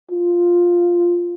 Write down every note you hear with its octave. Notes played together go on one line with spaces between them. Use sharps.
F4